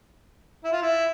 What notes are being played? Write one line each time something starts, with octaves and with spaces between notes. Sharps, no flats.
E4
F4
E4